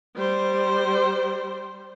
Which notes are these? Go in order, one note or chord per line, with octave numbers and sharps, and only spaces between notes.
G3 C5